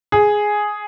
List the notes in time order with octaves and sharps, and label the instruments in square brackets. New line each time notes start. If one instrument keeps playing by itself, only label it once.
[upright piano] G#4